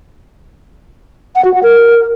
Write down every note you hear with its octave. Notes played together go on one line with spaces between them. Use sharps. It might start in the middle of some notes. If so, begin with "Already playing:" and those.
F#5
F#4
F#5
A#4